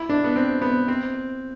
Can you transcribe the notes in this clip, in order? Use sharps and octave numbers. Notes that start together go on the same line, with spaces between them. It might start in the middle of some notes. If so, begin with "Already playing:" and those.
Already playing: E4
D4
B3
C4
B3
C4